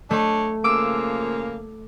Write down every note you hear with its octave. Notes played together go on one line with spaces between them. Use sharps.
A3 D4 C#5 D#5
C#3 F3 A#3 D6 E6